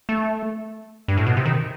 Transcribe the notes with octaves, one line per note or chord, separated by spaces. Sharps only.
A3
G2
A2
B2
C3
D#3